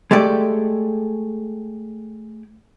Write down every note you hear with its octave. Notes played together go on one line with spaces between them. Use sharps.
G#3 A3 G4 D5